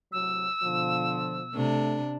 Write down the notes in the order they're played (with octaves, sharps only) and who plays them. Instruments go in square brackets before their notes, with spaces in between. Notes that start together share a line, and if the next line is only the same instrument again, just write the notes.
[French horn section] A2 C3 F#3 [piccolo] E6
[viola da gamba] B2 [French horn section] D3 F3
[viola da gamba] C3 D4 [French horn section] A3